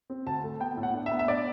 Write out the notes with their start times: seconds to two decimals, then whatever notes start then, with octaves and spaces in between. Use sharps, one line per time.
0.10 C4
0.26 D2 A5
0.44 A3
0.60 B3 G5
0.77 A2
0.83 F#5
0.94 D4
1.06 E5
1.11 B3
1.19 E5
1.28 D4 D5